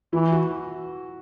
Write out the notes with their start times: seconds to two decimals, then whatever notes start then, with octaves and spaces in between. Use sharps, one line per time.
0.13 E3 E4
0.32 F#4